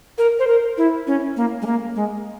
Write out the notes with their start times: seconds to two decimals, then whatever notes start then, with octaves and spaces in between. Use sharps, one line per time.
0.18 A#4
0.39 C5
0.47 A#4
0.78 E4
1.07 C#4
1.37 A#3
1.62 G#3
1.66 A#3
1.95 G#3